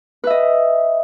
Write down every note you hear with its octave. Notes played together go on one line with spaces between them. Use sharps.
B4 D#5 E5